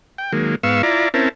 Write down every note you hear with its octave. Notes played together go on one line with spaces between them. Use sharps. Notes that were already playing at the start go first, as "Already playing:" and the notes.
G5
D#3 F#3 G#3 A#3
G#2 B3 F5 C#6 E6
E4 F4 D5 A#5
C4 C#4 E4 A#4 A5